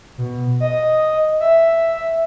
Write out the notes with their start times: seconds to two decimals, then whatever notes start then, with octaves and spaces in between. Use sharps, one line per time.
0.18 B2
0.60 D#5
1.40 E5